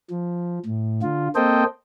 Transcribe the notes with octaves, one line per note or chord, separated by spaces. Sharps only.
F3
A2
D3 F4
A#3 C4 A4 C5 D#5 G5